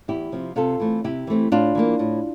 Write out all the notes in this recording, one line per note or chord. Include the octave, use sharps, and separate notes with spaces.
E2 E4 G4
C3 F3 C4
C3 F4 A4
E3 A3 C4
C3 E4 G4
E3 A3 C4
A2 D4 F4
E3 G3 A#3
A2